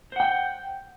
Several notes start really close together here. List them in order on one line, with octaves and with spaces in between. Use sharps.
C5 F#5 G5